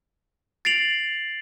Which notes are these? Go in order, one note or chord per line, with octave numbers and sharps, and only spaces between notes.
A6 C7 D7 F7 F#7